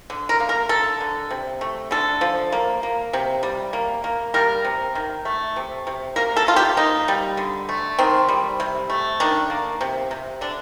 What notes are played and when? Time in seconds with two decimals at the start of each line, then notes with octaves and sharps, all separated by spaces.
0.10 D3
0.29 A#4
0.40 A#3
0.49 A#4
0.69 D3 A4
1.01 D3
1.31 C3
1.61 A3
1.91 D3 A4
2.21 F3
2.52 A#3
2.83 A#3
3.13 C3
3.43 G3
3.73 A#3
4.04 A#3
4.34 G3 A#4
4.65 C3
4.95 D#3
5.25 A3
5.56 C3
5.87 C3
6.16 A#3 A#4
6.36 A4
6.47 D#3 F4
6.56 G4
6.77 A#3 D#4
7.08 G3
7.37 D3
7.69 A3
7.99 D#3 C4
8.28 G3
8.60 C3
8.90 A3
9.20 D#3 D4
9.50 A#3
9.81 C3
10.11 C3
10.41 D3 D4